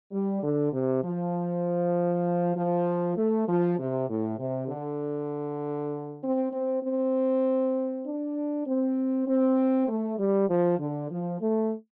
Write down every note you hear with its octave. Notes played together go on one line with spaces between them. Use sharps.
G3
D3
C3
F3
F3
A3
F3
C3
A2
C3
D3
C4
C4
C4
D4
C4
C4
A3
G3
F3
D3
F3
A3